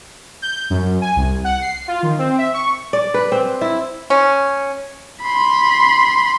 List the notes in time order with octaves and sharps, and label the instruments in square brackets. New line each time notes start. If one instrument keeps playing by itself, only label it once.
[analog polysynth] G6
F#2
G#5
C2
F#5
C7
F4
D#3
C4
E5
C#6
[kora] D5
B4
C4
E4
[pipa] C#4
[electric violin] B5 C6